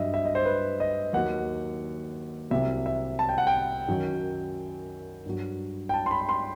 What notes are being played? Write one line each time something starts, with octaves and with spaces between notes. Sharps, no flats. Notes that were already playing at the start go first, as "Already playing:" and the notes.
Already playing: G2 F#3 D#5 E5
E5
D#5
C5
B4
D#5
D#2 D#3 F#3 F#5
C2 C3 F#3 E5
E5
A5
G5
F#5
G5
F#2 D#3 F#3
G2 F#3
G5
A5
C6
B5
C6